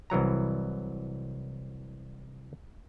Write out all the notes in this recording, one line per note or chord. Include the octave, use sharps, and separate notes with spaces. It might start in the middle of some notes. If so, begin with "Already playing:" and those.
C2 E3 F#3 A#5